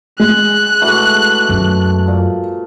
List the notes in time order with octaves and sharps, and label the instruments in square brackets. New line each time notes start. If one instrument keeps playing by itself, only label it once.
[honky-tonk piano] G#3 [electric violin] F#6
[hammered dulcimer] B2 E3 A3
[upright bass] F#2
[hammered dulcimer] A#2